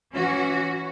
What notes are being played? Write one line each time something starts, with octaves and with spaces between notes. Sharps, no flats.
E3 C#4 F#4